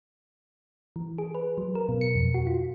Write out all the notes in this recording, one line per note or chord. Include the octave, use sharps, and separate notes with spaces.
E3
G#4
B4
F#3
A#4
B2
C#7
F2
F#4
F4